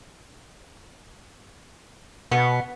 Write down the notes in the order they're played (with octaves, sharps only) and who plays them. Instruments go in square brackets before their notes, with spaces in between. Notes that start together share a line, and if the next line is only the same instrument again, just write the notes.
[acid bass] B2 [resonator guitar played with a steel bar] B3